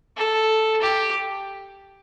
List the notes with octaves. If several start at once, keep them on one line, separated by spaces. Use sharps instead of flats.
A4
G4